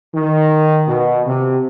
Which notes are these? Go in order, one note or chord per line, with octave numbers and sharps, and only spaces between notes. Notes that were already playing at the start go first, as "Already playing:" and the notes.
D#3
B2
C3